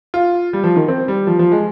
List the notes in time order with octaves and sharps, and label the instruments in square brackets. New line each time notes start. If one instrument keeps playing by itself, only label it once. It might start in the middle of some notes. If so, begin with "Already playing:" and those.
[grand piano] F4
G3
F3
D#3
C4
G3
F3
F3
G#3